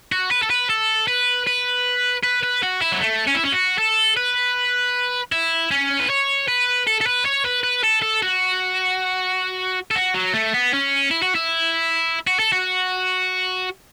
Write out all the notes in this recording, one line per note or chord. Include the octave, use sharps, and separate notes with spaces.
F#4
B4
A4
B4
A4
B4
B4
B4
B4
F#4
E4
F#3
A3
C#4
E4
C#4
F#4
A4
B4
E4
C#4
B4
C#5
B4
A4
A4
B4
C#5
B4
B4
A4
A4
F#4
A4
F#4
F#3
A3
B3
C#4
E4
F#4
E4
F#4
A4
F#4